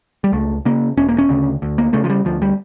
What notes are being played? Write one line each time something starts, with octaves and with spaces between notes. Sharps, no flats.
G3
C#2 A3
C#3 A#3
E1 C#4
A#3
C#4
D2 C#3
D2
A#3
C#3 A3
F3
G3
D2 F3
G3